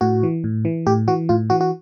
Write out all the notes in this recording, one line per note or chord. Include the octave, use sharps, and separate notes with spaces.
A2 F#4
E3
A2
E3
A2 G4
E3 F#4
A2 F4
E3 F#4
F#4